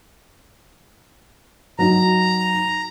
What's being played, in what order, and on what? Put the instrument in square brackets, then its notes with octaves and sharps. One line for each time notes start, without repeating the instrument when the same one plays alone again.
[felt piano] F#3 D#4 [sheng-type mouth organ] A#5